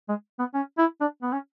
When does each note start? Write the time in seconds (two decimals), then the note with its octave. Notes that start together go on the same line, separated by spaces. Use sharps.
0.09 G#3
0.39 B3
0.54 C#4
0.78 E4
1.01 D4
1.23 B3
1.32 C#4